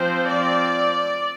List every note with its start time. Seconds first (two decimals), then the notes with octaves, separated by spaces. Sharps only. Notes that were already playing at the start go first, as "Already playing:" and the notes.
Already playing: F3 C4 C5
0.28 D5